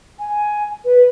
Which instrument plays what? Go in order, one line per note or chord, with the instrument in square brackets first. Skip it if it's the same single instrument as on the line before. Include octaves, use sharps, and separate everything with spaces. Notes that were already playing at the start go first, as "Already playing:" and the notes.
[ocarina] G#5
B4